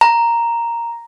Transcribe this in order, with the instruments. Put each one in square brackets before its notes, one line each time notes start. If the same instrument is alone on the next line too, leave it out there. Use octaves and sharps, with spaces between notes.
[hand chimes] A#5